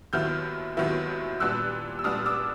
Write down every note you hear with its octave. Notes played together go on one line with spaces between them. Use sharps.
D#2 D#3 F#3 B3 E4 F6 G6
D#2 D#3 F#3 B3 E4
A#2 G3 B3 D4 E6 F#6
E6
A#2 G3 B3 D4 D#6 F6
D6 E6